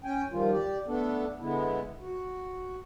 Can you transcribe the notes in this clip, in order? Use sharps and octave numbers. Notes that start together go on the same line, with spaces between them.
C#4 G5 G#5
G2 D#3 F3 G3 F4
G4 D5
A3 B3 D4 A4
D3 G#3 B3 E4
F#4